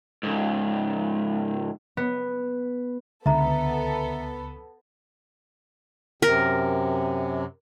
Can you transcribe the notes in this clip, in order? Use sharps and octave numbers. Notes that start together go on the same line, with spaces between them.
C#2 G#2
B3
C#2 D3 B3 A4 E5 A#5
F#2 C3 A#4